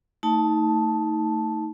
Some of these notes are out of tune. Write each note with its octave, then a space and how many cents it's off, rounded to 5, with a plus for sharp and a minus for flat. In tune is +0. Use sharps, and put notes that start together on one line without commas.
A3 +25 D#4 +20 A5 -5